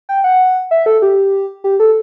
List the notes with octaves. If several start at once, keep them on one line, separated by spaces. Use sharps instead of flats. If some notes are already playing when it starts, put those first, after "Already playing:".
G5
F#5
E5
A4
G4
G4
A4